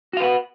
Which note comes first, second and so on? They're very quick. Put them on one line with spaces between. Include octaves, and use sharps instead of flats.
F#4 F5 B4 F#5